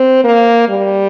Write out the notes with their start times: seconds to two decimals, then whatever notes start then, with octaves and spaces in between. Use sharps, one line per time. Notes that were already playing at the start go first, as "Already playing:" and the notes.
Already playing: C4
0.24 A#3
0.69 G3